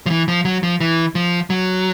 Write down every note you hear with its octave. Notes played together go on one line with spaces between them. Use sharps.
F3
E3
F3
F#3
F3
E3
F3
F#3